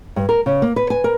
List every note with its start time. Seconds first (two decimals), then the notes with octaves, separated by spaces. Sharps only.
0.16 G2
0.29 A#4
0.46 C#3
0.62 A#3
0.76 B4
0.90 G#5
1.04 A#4